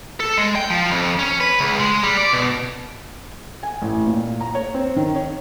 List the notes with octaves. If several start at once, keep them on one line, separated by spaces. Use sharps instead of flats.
A4
G#3
G5
F3
F2
C#4
B4
C#2
G#3
G3
D5
B2
G#5
A1
A#2
A#5
C#5
C4
D#3
C#5